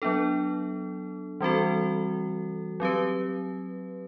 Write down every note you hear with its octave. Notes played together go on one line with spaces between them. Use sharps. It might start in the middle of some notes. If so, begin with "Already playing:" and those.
F#3 B3 D4 A4
E3 G3 C4 F#4 A4
F#3 C4 G4 B4